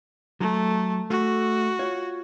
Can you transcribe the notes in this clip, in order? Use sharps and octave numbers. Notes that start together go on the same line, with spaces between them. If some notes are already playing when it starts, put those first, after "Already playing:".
F#3 A3
A3 F#4
F4 C#5